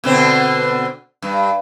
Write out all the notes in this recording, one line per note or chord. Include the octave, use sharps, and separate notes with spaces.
B2 D3 C4
G2